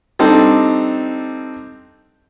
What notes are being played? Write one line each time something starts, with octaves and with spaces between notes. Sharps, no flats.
G3 C4 D4 D#4 A4